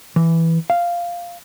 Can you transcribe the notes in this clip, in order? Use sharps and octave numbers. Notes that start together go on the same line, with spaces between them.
E3
F5